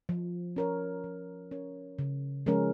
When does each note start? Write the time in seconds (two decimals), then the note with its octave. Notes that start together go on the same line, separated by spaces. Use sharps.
0.09 F3
0.56 C#4 A#4 C#5
1.04 F3
1.51 C#4 A#4 C#5
1.99 C#3
2.46 F3 G#3 C#4 A#4